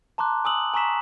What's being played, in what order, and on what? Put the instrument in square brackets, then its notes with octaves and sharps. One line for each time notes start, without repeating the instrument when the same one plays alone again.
[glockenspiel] A5 A#5 C6 D6 F#6
G#5 D#6 E6 F#7
G#5 A#5 C#6 E6 B6 E7